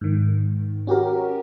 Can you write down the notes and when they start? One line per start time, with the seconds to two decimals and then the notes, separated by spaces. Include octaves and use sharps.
0.01 G#2 D#3
0.87 C#4 F#4 G4 A#4